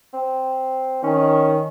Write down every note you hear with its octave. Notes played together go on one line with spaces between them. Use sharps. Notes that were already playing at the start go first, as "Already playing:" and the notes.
C4
D#3 C#4